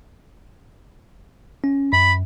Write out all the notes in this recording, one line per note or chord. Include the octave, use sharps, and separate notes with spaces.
C#4
F#2 B5